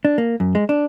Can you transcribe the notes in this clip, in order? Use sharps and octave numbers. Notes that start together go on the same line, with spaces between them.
D4
A#3
F#2
G#3
D4